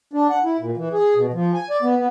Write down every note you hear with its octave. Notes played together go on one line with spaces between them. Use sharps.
D4
F#5
E4
A#2
E3
G#4
B2
F3
G#5
D5
B3
B3